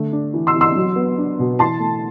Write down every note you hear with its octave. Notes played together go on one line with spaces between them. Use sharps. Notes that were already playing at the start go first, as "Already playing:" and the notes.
Already playing: D3 A3
D4
E3
C6 E6
E3
C6 E6
F#3
B3
D4
B2
E3 A5 C6
A3